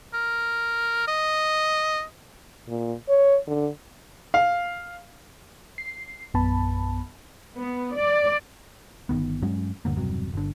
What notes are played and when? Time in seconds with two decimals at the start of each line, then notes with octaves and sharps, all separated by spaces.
0.14 A#4
1.08 D#5
2.68 A#2
3.09 C#5
3.47 D3
4.34 F5
5.78 C7
6.34 A#1 F#2 B3 A5 B5
7.59 B3
7.97 D5
9.09 G1 G2 D#3 B3
9.42 G2 F#3 G#3 C#4
9.85 D#1 G2 D3 A#3
9.96 E1 G2 C3 F#3
10.34 G1 D3